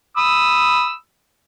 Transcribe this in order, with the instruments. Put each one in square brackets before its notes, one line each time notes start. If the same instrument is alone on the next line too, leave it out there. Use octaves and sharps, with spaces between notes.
[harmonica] B5 D#6 E6